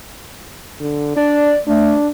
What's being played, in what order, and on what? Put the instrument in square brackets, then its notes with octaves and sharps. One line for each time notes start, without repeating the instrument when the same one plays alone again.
[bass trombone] D3
[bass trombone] D4 [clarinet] D5
[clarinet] A3 [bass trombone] D4